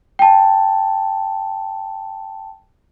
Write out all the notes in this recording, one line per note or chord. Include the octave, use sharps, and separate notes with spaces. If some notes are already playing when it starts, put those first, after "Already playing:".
G5 A5